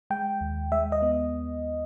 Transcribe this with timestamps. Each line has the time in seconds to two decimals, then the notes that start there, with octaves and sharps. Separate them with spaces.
0.10 G#3 G5
0.41 D#2
0.72 G#3 E5
0.92 D#5
1.02 B3